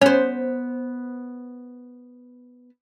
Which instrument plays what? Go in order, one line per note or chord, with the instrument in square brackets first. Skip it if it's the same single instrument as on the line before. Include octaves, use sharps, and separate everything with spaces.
[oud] B3 C5 [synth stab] C#4